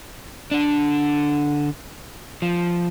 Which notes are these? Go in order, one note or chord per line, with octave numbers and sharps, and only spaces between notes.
D3 D4
F3